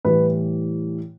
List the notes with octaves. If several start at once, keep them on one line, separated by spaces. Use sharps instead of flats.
A2 E3 G3 B4